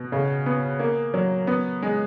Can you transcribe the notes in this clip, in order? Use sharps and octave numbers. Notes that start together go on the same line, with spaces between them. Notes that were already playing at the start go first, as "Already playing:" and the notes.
Already playing: B2
C#3
B3
A#3
F#3
B3
G#3